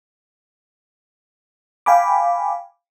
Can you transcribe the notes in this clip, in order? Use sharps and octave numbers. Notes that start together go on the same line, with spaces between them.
F5 G5 G#5 B5 D6